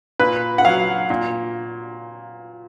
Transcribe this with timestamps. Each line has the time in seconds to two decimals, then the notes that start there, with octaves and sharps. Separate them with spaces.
0.19 A#2 B4
0.58 F#5
0.65 F#3 F5
1.10 A#2